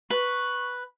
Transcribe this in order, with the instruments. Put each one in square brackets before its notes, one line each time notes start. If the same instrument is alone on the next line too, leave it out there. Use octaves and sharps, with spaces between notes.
[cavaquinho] B4 [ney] C#6